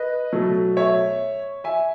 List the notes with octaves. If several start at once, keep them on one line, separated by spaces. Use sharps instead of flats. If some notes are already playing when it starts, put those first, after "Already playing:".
Already playing: B4 D#5
B2 F#3 A3
C#5 E5
E5 G#5